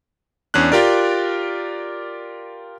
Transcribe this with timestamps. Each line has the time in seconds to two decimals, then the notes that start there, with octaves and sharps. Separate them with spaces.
0.54 E2 C#4 D4 F#6
0.72 F4 G4 A#4 D5